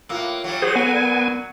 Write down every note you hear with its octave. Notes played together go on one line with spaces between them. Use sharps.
A2 A#3 F4 F5 E6
F#3 G3
F#3 G#4 C5
B3 A4 G#5
A#4 D5 G#6